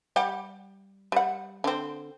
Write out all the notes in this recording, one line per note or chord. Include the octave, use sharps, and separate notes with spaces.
G3 G4 F#5
G3 F#5
D3 C4